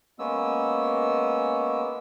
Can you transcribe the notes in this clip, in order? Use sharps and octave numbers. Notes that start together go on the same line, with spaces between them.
G#3 A#3 B3 C#4 E6